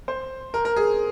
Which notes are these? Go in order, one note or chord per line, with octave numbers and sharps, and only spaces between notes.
C5
A#4
A#4
G#4